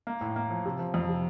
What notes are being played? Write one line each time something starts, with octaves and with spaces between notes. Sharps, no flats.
A#3
A2
A#3
F3
C3
F3
F2
C3